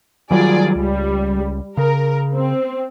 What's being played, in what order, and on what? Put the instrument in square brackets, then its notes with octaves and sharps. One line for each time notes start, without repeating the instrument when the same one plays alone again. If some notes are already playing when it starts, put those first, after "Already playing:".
[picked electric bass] D#3 F#3 G3 [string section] F4 G#4 D5
[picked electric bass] C#2 [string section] G3
[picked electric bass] C#3 [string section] A#4
[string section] C4